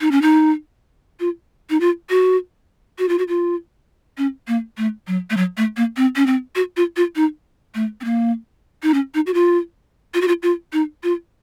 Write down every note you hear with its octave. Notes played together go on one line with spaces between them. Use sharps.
D#4
C#4
D#4
F4
D#4
F4
F#4
F#4
F4
F#4
F4
C#4
A#3
A3
F#3
A3
F#3
A3
A#3
C4
C#4
C4
F#4
F4
F4
D#4
A3
C4
A#3
D#4
C#4
D#4
F#4
F4
F4
F#4
F4
F4
D#4
F4